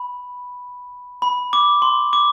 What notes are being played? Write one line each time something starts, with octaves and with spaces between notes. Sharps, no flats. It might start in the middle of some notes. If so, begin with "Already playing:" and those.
Already playing: B5
B5
D6
C6
D6